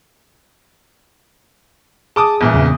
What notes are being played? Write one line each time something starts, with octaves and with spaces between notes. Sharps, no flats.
G#4 A5 D6 D#6
G1 A#2 E3
E2 C#3